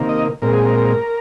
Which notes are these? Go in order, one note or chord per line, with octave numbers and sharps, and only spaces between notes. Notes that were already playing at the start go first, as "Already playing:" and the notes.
Already playing: C3 D#3 A#3
D#5
A#2 G#3 C4 A#4
G#4
A#4